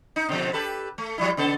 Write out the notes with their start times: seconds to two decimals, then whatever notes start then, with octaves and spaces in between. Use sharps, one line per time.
0.16 D#4
0.29 B2 D3 F3
0.53 G4 A4 B4
0.98 A3
1.18 F3 G3 E4
1.37 C#3 B3 A4